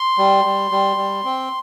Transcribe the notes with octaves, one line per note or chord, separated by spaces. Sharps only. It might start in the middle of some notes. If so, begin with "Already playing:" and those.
Already playing: C6
G3
G3
G3
G3
C4